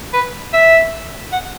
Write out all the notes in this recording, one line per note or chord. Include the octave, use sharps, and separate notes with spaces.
B4
E5
F#5